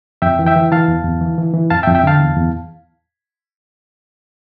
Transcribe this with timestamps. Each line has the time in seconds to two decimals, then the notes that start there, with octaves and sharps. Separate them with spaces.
0.22 F2 E5 G5
0.39 E3
0.46 E5 G5
0.56 E3
0.72 E3 F5 A5
0.88 E2
1.04 E2
1.21 E3
1.38 E3
1.54 E3
1.70 F2 F5 A5
1.83 E5 G5
1.87 F2
1.95 E5 G5
2.03 D3 F5 A5
2.19 E2
2.36 E2